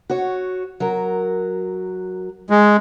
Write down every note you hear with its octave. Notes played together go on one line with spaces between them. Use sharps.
F#4 C#5
F#3 A#4
G#3